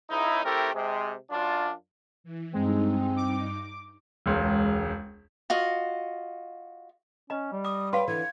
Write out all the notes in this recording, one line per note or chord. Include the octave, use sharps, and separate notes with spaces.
C#2 D#4 E4
A3 C4 E4 G4 A4 A#4
C3 G#3
F#2 D4 F4
E3
G2 G#3 C4 D#4
D6
E1 C#2
F4 F#4 D#5
C#4 D#5 A#5
G3
D6 D#6
B4 C#5 F5 G5 C6
D3 E3 B4 G#6